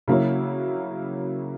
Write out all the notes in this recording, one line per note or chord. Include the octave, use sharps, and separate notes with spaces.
C#3 F#3 A#3 C#4 E4